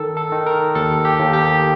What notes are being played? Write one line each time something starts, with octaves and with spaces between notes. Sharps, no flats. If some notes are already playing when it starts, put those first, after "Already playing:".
Already playing: D#3 A4
A4
D#3
A#4
D#2 A4
G4
D#2
G4